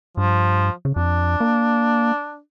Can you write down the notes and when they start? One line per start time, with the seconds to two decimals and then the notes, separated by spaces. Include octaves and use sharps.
0.17 G2 F3
0.85 C#3
0.96 F2 D4
1.41 A#3